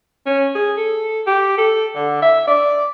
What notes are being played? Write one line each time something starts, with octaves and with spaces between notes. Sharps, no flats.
C#4
G#4
A4
G4
A4
D3
E5
D5